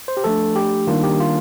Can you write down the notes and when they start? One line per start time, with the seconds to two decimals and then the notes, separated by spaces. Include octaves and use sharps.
0.08 C5
0.17 G4
0.24 F3 A3 D4 A4
0.56 G4
0.87 D#3 G3 A#3 D4 F4
1.03 G4
1.20 F4